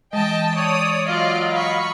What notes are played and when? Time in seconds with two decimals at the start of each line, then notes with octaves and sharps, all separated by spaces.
0.13 E3 G#3 D#5 G5 A5
0.56 C#5 D5 D#6
1.06 F#3 F4 D5 D#5 F5
1.53 B5 C#6